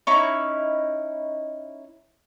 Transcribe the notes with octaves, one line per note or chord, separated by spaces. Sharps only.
C#4 D#4 E4